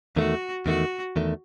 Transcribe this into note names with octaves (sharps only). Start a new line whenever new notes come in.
E2 D#3 A3 F#4
E2 D#3 A3 F#4
E2 D#3 A3